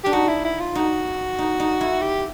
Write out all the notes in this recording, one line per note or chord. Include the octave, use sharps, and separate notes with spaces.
D4 G4
D#4 F#4
E4
E4
F4
D#4 F#4
D#4
D#4
E4
G4